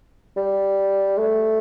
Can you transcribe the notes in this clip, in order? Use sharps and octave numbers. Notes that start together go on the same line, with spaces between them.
G3
A3